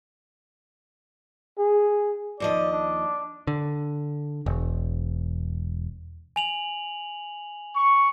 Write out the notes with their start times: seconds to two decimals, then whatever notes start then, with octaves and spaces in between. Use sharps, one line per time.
1.58 G#4
2.40 D#2 F3 D5 D#5
2.72 D4
3.47 D3
4.46 E1
6.36 G#5 F7 F#7
7.75 C#6